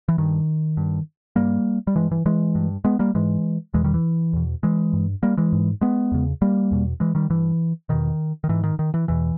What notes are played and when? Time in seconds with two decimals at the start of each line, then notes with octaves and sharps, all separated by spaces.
0.09 E3
0.18 G2 D#3
0.77 G2
1.36 G2 G3 A#3
1.87 G3
1.96 G2 E3 G#3
2.11 E3
2.26 E3 G#3
2.55 G2
2.84 G#3 B3
2.99 G3 A#3
3.15 G#2 E3 G#3
3.74 E2 B2 E3 G#3
3.84 D#3 G3
3.94 E3
4.33 E2 B2
4.63 E3 G#3
4.93 G2
5.23 G3 A#3
5.37 E3 G#3
5.53 G#2
5.81 G#3 B3
6.12 E2 C#3
6.42 G3 A#3
6.71 E2 B2
7.00 E3 G#3
7.15 D#3 G3
7.30 G2 E3
7.89 E2 B2 D#3
8.44 D#3
8.49 G#2 E3
8.64 D#3
8.79 D#3
8.94 E3
9.08 E2 B2 E3